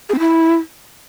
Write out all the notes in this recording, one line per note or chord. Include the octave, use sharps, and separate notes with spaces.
G#4
C4
E4